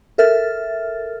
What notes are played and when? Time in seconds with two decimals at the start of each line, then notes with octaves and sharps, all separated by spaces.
0.18 A4 A#4 E5 F6 A6